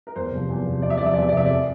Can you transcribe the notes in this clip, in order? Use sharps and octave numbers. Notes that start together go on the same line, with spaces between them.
A#4
E2 C5
C3 F3
E2
C3 F3
E2 D5
E5
C3 F3 D5
E5
E2 D5
E5
D5
C3 F3 E5
F2 D5